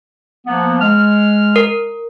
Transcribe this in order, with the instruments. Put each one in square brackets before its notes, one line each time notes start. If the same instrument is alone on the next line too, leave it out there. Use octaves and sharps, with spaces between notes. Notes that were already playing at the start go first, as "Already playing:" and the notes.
[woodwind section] F3 A#3 B3
G#3 F6
[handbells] A#4